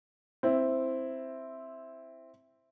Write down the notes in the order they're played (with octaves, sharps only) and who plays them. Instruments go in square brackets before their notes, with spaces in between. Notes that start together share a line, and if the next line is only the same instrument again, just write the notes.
[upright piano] C4 E4